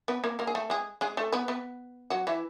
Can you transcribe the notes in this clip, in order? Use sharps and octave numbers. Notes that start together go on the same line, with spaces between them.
B3 B4
A#3 A#4
A#3 A#4
G#4
A3 A4
G#3 G#4
G#3 G#4
A3 A4
B3 B4
B3 B4
F#3 F#4
E3 E4